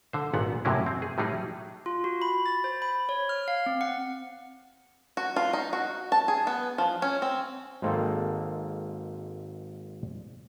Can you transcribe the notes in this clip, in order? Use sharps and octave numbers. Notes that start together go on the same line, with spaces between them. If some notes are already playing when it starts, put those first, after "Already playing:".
D3 C5
G#1 A#2 B3 F#5
F#2 A2 C3 F#3 A#3 E4
C4
G#4
A2 F#3 G3 D#4 G#4
F4
F#4
B5
A6
C5
B5
C#5
F6
F5
C4
F#5
F#4
F4
D#4
F#4
A5
G#4
B3
F3
C#4
C4
G#1 G#3 A#3 C4 A4